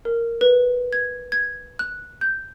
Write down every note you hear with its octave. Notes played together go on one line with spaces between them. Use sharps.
A#4
B4
G#6
G#6
F#6
G6